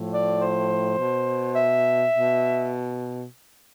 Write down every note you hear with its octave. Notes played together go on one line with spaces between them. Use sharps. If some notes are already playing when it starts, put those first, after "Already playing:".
Already playing: A2 F3
D5
C5
B2
E5
B2